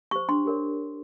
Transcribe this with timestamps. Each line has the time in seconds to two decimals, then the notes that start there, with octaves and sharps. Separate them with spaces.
0.11 G4 C5 C#6
0.29 D4 C6
0.45 G4 A#4 C#5